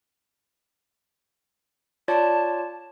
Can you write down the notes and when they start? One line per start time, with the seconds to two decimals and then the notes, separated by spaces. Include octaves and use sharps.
2.08 F4 C#5 D5 A5